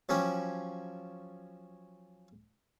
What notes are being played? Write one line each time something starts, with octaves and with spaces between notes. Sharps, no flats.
F3 F#3 C#4 G4